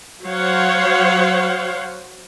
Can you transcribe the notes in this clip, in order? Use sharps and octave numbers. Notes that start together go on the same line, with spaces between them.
F#3 C5 C#5 F5 F#5